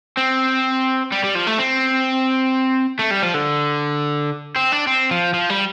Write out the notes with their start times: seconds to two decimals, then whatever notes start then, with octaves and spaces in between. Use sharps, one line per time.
0.17 C4
1.12 G3
1.24 G3
1.35 F3
1.47 A3
1.59 C4
2.99 A3
3.11 G3
3.22 F3
3.34 D3
4.56 C4
4.72 D4
4.87 C4
5.11 F3
5.34 F3
5.49 G3